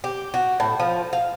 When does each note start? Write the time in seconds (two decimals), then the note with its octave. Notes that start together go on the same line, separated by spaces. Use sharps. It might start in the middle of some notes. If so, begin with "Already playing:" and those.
0.04 G4
0.34 F#4
0.60 A2
0.80 F3
1.13 F5